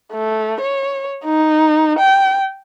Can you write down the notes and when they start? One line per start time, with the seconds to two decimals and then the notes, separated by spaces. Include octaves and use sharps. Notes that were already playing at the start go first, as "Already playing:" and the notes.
0.12 A3
0.61 C#5
1.25 D#4
1.99 G5